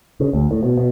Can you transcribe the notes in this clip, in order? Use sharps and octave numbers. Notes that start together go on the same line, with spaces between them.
C#3
D2
A2
B2
B2